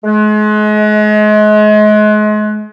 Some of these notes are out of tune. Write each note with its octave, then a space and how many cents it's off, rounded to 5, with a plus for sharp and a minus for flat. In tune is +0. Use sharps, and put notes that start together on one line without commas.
G#3 +35